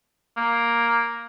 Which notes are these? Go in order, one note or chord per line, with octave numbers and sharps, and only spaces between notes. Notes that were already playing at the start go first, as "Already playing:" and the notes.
A#3